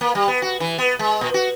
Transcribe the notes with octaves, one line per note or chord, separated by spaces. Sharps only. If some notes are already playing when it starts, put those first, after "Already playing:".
A#3
G3
B3
F#4
E3
B3
G#3
A#2
F#4